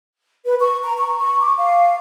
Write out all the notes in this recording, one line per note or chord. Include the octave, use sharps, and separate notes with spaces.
B4
C#6
A#5
C#6
C#6
D6
F5